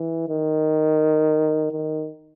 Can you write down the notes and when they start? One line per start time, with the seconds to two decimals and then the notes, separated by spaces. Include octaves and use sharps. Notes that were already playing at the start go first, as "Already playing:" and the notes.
Already playing: E3
0.29 D#3
1.72 D#3